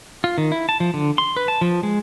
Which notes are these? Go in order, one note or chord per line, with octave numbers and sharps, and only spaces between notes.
F4
D#3
E4
A5
F3
D3
C6
B4
A5
F3
G#3